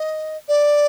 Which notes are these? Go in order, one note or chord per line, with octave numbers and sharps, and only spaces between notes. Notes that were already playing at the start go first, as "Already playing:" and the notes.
Already playing: D#5
D5